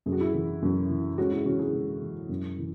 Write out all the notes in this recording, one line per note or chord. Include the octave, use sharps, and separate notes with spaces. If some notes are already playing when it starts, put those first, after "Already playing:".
F#2 G#4
F#4
E4 G#4
E3
F#2
E3
G#2 C#4 F#4
E4 G#4
E3 C#4 F#4
E4 G#4
G#2
E3
F#2
E3